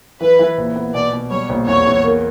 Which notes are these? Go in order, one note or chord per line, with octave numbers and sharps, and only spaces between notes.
E3 B4
E3
A#1
B3
B2 D5
B2
G3 C#5
A#1
E2 C#5
E2
A#3